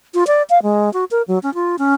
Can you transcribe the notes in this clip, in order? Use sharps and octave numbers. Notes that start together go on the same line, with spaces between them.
F4
D5
F5
G#3
F#4
A#4
F#3
C#4
F4
C#4